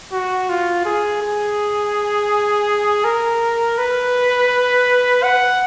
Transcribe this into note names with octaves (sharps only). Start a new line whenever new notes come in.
F#4
F4
G#4
G#4
A#4
B4
F#5